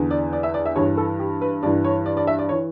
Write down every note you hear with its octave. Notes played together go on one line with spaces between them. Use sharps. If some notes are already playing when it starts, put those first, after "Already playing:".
Already playing: E2 D3
D5
D5
E5
D5
E5
G2 E3 C#5
A4
G4
B4
G2 E3 D5
C#5
D5
D5
E5
D5
C#5
E3